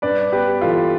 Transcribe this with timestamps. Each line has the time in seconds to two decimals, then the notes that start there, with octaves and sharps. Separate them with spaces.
0.02 G2 B4 D5
0.32 B3 G4 B4
0.62 E3 F4 A4